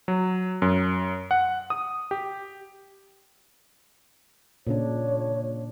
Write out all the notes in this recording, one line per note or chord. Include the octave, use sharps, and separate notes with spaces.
F#3
F#2
F#5
D#6
G4
A#2 C#3 D4 C#5